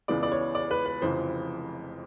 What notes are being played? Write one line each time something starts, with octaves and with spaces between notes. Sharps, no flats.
C#2 C#3 E3 G#3 B3 D5
D5
C#5
D5
B4
B4
F1 F2 C#3 E3 C5